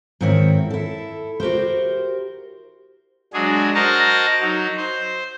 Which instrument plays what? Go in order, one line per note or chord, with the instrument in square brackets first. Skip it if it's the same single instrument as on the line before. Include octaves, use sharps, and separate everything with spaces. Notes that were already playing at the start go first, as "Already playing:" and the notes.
[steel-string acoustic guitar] G#2 D#3 C4 E4 A#4 C#5
E4 A4
F#4 G4 A#4 C5
[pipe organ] F#3 G#3 D4 G#4
F#4 A#4 C5 D#5 A5 A#5
F#3 D#4
C5